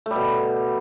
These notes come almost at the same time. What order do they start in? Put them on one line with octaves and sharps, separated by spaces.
A3 G3 B2